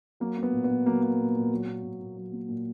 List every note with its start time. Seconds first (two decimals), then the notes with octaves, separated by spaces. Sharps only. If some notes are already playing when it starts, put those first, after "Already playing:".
0.20 F#3 A#3
0.37 A#3
0.43 B3
0.53 A#2
0.64 B3
0.70 A#2
0.86 F#3 A#3
1.03 A#3
1.19 A#2
1.35 A#2
1.52 F#3
1.67 A#3
1.83 A#2
2.00 A#2
2.17 F#3
2.33 A#3
2.48 A#2